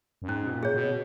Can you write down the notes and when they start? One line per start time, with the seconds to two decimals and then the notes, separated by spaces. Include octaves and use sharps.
0.22 F#2
0.28 G#2 C#4
0.47 B2
0.51 A#2
0.63 G#4 C#5
0.74 B2